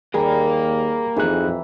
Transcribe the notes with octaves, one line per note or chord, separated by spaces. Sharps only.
D#2 G3 A#3 G#4 A#4
F2 E3 D#4 G#4 E5 A#5 F#6